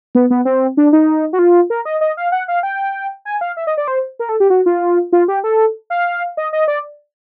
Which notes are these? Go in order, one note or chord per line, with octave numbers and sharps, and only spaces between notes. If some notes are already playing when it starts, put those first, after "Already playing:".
B3
B3
C4
D4
D#4
F#4
F4
A#4
D#5
D#5
F5
F#5
F5
G5
G#5
F5
E5
D#5
D5
C5
A#4
A4
G4
F#4
F4
F4
G4
A4
F5
D#5
D#5
D5